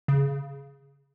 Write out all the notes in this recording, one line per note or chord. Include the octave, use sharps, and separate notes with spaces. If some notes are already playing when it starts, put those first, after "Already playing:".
C#3